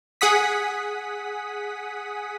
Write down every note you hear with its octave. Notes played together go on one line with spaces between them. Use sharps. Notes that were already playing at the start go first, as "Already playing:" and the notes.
G#4 F#5 D#6 B6